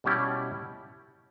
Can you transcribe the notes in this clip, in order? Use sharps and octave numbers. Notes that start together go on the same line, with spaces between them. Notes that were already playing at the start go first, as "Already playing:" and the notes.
B2 G3 C#4 E4 G4